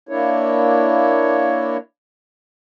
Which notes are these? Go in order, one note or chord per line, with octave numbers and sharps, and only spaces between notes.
A#3 D4 E4 C#5